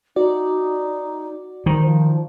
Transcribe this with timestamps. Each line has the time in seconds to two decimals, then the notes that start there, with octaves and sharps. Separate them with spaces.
0.16 D#4 F#4 D5
1.66 D#3 C5
1.86 F3